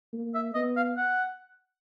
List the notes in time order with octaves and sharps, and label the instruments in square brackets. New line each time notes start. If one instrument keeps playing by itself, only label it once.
[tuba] A#3
[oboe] E5
[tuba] B3 [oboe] D#5
[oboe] F5
F#5